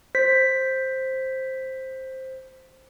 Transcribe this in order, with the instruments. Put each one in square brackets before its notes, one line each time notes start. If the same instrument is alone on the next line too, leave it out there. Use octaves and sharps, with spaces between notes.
[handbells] C5 B6